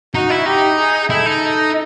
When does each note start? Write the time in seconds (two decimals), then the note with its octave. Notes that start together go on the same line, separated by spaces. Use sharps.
0.15 D#4 F#4
0.30 E4
0.46 D#4 G4
0.78 G#4
1.10 E4 A4
1.26 D#4